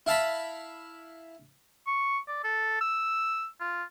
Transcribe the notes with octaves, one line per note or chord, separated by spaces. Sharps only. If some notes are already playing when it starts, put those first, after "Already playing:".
E4 F5 A5 B5
C#6
D5
A4
E6
F4